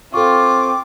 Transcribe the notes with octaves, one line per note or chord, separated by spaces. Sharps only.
C4 F4 A4 C#6 D6